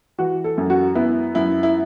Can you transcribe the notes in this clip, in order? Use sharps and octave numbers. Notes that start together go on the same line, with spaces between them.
E3 F#4
A4
F#2
F#4
B3 E4
F#2 E4
E4